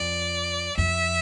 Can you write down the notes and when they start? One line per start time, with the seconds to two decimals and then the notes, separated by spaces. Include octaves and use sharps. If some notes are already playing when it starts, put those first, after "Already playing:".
Already playing: F2 D5
0.77 F2 E5